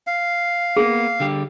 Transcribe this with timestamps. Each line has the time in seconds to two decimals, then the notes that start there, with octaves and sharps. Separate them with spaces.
0.07 F5
0.77 A#3 B3 G#4
1.20 D3 G3 G4